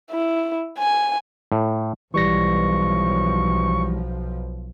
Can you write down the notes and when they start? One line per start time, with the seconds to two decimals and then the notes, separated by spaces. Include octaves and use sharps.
0.11 E4
0.79 G#5
1.52 A2
2.14 B1 E3 F3 G3 C#6 A#6